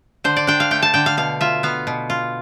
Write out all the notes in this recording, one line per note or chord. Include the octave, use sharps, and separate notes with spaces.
D3 C5
D5
D4 G5
F5
A3 G5
A5
D3 G5
F5
B2 F5
F4 E5
B3 F5
B2
F4